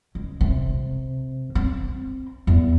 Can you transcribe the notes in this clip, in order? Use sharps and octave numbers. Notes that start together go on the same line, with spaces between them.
C#2
C3
C4
E2